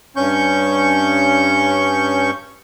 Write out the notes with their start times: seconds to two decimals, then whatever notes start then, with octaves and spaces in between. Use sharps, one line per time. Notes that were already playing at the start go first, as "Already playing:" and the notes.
0.16 G2 C#4 C#6 G6